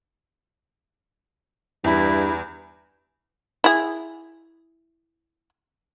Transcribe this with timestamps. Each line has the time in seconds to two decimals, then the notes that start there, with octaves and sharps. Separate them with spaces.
1.84 E2 G2 E4
3.64 E4 G#4